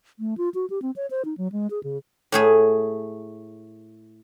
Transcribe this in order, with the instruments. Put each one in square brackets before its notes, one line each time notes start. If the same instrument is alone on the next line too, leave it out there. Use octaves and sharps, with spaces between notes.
[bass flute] A3
F4
F#4
G4
C4
C#5
C5
D#4
F#3
G#3
G#4
C#3
[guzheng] A2 A3 G#4